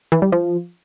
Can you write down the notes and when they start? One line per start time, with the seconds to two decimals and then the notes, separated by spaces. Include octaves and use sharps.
0.12 E3
0.22 G3
0.32 F3